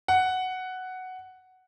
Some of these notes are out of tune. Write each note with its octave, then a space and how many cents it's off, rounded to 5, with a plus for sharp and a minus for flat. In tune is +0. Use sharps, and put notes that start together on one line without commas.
F#5 +5